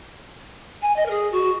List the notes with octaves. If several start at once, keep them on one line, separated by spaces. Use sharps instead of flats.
G#5
D#5
A#4
G#4
F#4